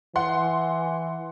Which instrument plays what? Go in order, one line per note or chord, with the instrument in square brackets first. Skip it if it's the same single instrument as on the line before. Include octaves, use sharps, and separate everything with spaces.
[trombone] E3 [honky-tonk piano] F#5 C6